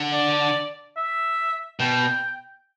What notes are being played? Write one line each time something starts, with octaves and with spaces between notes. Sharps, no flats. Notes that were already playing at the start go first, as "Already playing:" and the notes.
Already playing: D3
D5
E5
B2 G5